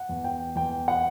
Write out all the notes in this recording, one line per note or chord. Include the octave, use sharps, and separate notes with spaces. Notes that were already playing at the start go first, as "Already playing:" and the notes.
Already playing: F#5
E2
G5
E2 G5
F#5